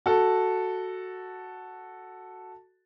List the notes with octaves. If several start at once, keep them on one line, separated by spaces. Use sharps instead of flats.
F#4 A4